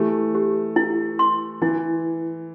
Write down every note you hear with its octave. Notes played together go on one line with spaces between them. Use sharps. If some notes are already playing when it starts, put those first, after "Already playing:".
Already playing: E3 A3 G4
G4
E4
C6
E3 E4